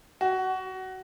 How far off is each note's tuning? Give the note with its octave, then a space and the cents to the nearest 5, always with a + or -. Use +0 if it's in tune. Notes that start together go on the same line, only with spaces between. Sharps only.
F#4 +20